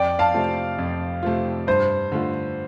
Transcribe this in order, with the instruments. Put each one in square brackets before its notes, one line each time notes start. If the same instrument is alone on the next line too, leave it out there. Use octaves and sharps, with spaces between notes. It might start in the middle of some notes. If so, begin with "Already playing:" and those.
Already playing: [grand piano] F2 [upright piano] D5 G5
[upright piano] F5 A5
[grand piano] C3 A3 C4 F4
F2
C3 A3 C4 F4
[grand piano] G2 [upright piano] C5
[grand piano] D3 A3 F4